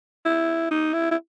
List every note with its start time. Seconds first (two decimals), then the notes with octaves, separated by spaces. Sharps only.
0.25 E4
0.71 D#4
0.93 E4
1.11 E4